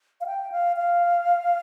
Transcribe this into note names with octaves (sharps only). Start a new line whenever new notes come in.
F5
G5
F5
F5